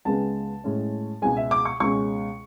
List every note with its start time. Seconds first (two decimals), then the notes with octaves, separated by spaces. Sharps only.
0.05 C#2 C#3 G#3 B3 A5
0.64 A2 G#3 C#4
1.22 C#2 B2 G#3 G#5
1.37 E5
1.51 D6
1.65 C#6
1.80 C#2 B2 G#3 C#4 C#6